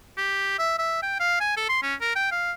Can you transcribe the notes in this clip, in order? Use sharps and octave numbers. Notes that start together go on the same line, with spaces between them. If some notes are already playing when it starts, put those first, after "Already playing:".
G4
E5
E5
G5
F5
G#5
A4
C6
C#4
A#4
G5
F5